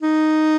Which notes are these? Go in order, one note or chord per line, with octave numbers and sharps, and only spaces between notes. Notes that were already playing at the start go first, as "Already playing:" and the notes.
D#4